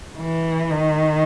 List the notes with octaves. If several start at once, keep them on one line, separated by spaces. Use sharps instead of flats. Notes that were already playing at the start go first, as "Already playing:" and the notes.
E3
D#3